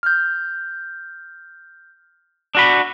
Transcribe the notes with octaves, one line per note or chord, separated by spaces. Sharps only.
F6 G6
D4 F#4 B5